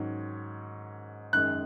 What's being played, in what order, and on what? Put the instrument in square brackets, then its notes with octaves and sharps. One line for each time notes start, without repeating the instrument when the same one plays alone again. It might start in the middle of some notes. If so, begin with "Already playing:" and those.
Already playing: [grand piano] G#2 D#3 F#3 C#4
F#2 D#3 G#3 F#6